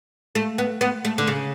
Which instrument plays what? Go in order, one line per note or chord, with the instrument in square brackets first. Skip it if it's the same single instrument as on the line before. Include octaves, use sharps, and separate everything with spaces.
[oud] A3
B3
B3
A3
D3
C#3